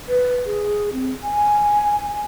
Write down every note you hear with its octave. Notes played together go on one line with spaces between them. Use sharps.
B4
G#4
C4
G#5